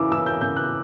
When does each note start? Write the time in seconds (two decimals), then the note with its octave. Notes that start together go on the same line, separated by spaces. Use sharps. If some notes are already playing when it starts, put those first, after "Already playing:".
Already playing: C#3 E3 E4 D6 E6
0.12 E3 E6
0.26 G6
0.41 C#3 G6
0.56 F#6